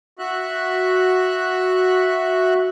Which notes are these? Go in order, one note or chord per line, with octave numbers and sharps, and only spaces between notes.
F#4 E5 F#6